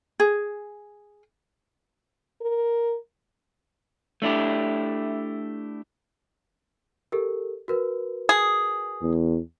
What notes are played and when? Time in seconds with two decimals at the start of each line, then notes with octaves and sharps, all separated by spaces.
0.20 G#4
2.42 A#4
4.22 A3 D4 E4 G4
7.12 G4 A4 A#4
7.68 F#4 A#4 B4
8.29 G#4
9.02 E2